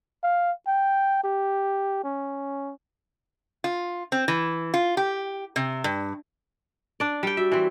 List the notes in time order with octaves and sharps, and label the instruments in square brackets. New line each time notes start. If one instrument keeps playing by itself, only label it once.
[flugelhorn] F5
G5
G4
C#4
[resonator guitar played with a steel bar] F4
C4
E3
F4
G4
C3
G2
[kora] D4 D5
G3 G5
[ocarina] F#4 [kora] E5
[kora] E3 C4